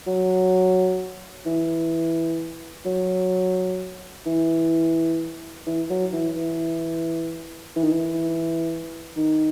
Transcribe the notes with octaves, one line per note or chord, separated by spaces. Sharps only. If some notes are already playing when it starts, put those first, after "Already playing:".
F#3
E3
F#3
E3
E3
F#3
E3
E3
E3
D#3
E3
D#3